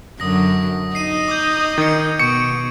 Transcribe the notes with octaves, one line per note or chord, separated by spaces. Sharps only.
F#2 D3 F#3 D#6 A#6
D#4 D#5 C7 D#7
D6 D#6 G6
D#3 G#6 C#7
B2 C#6 C#7 D7